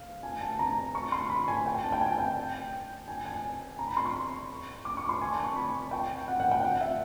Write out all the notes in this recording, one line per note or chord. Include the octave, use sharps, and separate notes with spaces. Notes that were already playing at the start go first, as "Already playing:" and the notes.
Already playing: F5
G#5
A5
A#5
C#6
C6
B5
G#5
G5
A5
G5
G#5
G5
G#5
G#5
A#5
B5
C6
C#6
D6
C#6
C6
G#5
A5
C#6
B5
G5
F#5
F#5
G5
F#5
E5